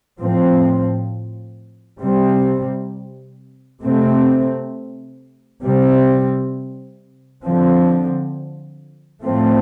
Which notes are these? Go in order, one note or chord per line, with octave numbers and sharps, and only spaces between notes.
A2 F3 C4
C3 G3 C4
C3 A3 C4
C3 G3 C4
D3 F3 C4
A2 F3 A3 C4